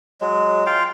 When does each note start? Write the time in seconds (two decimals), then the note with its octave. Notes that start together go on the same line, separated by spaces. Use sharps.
0.21 F#3 G#3
0.66 F4 F5 G5